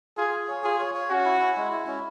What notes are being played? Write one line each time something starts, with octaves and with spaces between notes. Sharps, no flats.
F4 G#4
G#4
C#5
F4 G#4
C#5
C#5
C#4 F#4
E4
E4
G#3
E4
C#4